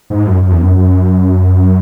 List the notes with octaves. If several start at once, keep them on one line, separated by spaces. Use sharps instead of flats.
G#2
F#2
F#2
E2
F#2
F#2